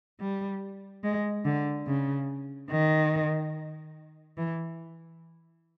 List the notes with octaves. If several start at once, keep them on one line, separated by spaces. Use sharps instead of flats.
G3
G#3
D3
C#3
D#3
E3